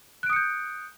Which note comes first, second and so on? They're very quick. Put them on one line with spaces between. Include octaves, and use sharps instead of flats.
F#6 D7 D#6 C#7 G6